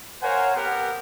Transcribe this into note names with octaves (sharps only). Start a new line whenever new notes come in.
A#4 C5 C#5 F5 F#5 G#5
B3 G4 A#4 F#5